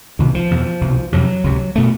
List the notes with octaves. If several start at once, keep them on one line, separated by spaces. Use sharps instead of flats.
C2 B2 D#3
F3
E2 B2
C2 B2
F2 C3 F#3
C#2 C3
B2 A3